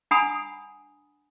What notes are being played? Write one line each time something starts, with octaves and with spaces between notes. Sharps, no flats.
D4 F#5 G#5 A#5 B5 D#6